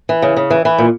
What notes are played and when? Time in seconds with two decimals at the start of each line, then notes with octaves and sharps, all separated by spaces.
0.09 E3
0.22 C#3
0.37 C#3
0.50 E3
0.65 E3
0.78 A#2